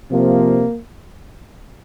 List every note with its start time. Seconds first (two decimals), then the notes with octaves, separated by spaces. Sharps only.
0.11 C3 F3 A#3